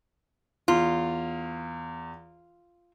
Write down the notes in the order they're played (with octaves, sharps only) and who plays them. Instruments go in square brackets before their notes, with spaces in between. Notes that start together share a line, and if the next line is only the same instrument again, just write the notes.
[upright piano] E2 [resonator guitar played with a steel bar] F4